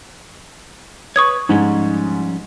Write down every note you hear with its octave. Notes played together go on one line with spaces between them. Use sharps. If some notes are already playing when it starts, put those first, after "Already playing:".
B4 C#5 C#6 D#6 G#6
G#2 F3 G3 C#4